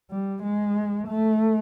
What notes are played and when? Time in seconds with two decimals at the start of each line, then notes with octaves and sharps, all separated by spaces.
0.11 G3
0.44 G#3
1.08 A3